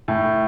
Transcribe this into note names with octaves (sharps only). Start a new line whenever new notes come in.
A2